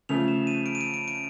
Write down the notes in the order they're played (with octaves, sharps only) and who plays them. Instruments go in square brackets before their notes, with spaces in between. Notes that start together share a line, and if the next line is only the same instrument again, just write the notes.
[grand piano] C#3 F3 A3 [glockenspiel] F7
[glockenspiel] E7
D#7
D7
D#7
D7
D7
D7